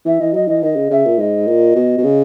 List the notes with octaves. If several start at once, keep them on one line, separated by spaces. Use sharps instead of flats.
E3 E5
E3 D#5
F#3 D#5
E3 D#5
D#3 D#5
C#3
C#3 E5
A#2
G#2 D#5
A#2
B2
B2
C#3